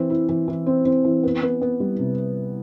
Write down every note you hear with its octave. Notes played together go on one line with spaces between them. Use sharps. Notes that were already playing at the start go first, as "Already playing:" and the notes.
Already playing: E3 C4
E4
E3
E3
C4
C4
E3
B3
B3
B3
G3
C3